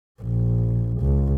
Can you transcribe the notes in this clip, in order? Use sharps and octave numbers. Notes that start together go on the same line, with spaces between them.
A#1
C#2